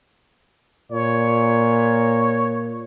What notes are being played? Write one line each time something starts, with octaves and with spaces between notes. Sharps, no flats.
A#2 C#5